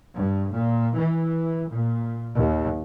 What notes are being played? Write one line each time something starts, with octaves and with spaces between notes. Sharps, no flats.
G2
A#2
E3
A#2
D#2